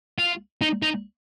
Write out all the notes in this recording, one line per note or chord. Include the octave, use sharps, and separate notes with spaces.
F4
D#4
D#4